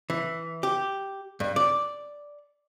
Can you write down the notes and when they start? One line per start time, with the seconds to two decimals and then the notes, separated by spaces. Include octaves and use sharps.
0.10 E3
0.63 G4
1.40 G2
1.56 D5